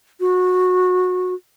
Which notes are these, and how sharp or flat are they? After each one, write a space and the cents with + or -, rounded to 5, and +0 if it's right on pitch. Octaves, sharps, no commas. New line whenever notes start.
F#4 -20